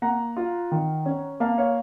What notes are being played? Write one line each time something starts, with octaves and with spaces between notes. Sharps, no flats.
A#3 F#5 A#5
F4
D#3
C#4
A#3 F5 A5
C#5 F5